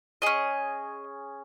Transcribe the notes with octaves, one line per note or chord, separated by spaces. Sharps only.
C#4 G#4 D#5